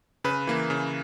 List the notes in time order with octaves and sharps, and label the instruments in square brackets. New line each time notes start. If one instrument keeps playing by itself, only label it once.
[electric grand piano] C#3 B4
E3 A#3
C#3